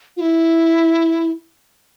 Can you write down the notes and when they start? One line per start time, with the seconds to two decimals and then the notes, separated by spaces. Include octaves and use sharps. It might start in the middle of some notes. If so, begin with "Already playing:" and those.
0.17 F4
0.21 E4